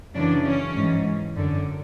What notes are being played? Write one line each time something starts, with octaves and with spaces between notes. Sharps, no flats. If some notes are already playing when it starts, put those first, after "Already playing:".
F#2 C#3 E3 D4
C#4
G#2 E3
F#2 D3